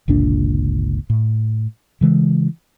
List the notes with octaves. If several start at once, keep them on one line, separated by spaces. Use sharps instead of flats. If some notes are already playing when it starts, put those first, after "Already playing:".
G1 C#2 A#2 D4
A2
C#3 E3 G#3